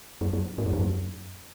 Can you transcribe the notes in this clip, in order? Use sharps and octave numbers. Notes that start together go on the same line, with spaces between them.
F#2
F#2
G#2
F#2
F2
F#2